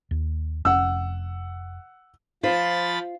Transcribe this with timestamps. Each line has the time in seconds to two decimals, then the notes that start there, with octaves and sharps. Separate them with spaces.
0.11 D#2
0.65 F1 C#4 F#5 E6
2.43 F3 F4 C5 B5 A6